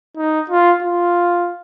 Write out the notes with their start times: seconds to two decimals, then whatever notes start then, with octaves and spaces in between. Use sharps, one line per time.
0.17 D#4
0.50 F4
0.83 F4